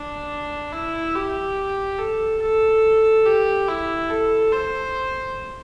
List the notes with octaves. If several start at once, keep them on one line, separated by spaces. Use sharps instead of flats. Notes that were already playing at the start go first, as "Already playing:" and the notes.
Already playing: D4
E4
G4
A4
A4
G4
E4
A4
C5